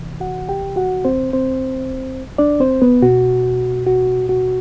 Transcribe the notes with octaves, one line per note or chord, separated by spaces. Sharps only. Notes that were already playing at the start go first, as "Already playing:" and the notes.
Already playing: C3 E3
F#4 F#5
G4 G5
F#4 F#5
C4 C5
C4 C5
D4 D5
C4 C5
B3 B4
B2 F#4
F#4
F#4